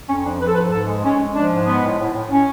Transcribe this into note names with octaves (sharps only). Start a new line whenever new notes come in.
F2 C#4
F3 D4
F3 B4
A4
G#2 B4
G#2 A4
G#3
G#3 C#4
G#3
F3 D4
G#2
G#3 B3
A2
A2
A2
A2 C#4